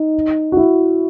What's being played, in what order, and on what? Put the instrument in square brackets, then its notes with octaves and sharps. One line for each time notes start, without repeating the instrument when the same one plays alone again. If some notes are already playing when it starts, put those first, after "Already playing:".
Already playing: [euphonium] D#4
[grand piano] F#4
E4